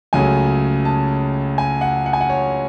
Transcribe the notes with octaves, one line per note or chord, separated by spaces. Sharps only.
C#2 C#3 F#3 A3 G#5
A5
G#5
F#5
F#5
G#5
F#5
C#5